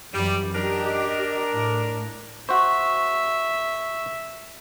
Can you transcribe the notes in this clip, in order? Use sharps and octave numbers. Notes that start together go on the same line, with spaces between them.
F#2 E3 F#3 G3
D4 G4 A#4 D#5
A2
F#4 C5 E5 C#6